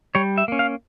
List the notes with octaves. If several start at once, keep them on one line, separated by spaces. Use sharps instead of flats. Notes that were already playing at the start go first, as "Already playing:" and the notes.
G3 C#5
E5
A#3 C#4
F5